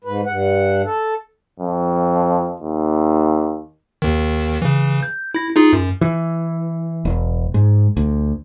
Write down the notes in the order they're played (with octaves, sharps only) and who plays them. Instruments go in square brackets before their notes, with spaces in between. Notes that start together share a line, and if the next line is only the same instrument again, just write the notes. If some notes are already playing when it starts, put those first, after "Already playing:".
[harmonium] G#2 B4
G2 F#5
A4
[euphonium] F2
D#2
[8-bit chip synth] D#2 D#3
C#3 E3
G6
E4 A#6
D#4 F4 G#4
F#2
[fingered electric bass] E3
E1
G#2
D2